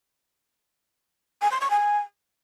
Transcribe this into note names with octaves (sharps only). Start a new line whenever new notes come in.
G#5
C6
C#6
G#5